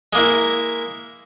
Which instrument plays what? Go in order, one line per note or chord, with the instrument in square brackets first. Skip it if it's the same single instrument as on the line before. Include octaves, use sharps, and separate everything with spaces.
[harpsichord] G#3 A#3 E4